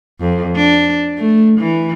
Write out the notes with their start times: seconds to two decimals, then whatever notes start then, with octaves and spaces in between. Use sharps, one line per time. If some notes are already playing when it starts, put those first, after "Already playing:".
0.20 F2
0.56 D4
1.17 A3
1.59 E3